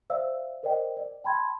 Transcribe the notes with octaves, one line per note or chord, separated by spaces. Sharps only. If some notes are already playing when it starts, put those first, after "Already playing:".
C5 D5 E5 F5 E6
A#4 C5 D5 D#5 G5
D5
G5 A5 B5 C6 G#6